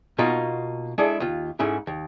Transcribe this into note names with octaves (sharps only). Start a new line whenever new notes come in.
B2 A#3 D#4 F4 F#4
G#3 D4 E4 G#4 A4 D5
D#2 F4
G#2 A3 C#4 E4 G#4
D#2